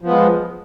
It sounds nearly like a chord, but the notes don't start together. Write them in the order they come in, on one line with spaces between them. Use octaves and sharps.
F3 B3 G#3